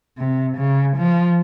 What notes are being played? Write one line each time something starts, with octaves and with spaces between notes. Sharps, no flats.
C3
C#3
F3